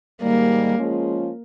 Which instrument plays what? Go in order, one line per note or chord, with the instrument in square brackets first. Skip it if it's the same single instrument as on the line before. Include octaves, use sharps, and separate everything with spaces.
[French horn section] G#2 D#3 G3 [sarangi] A#3
[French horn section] F3 G#3 C#4 F4 G#4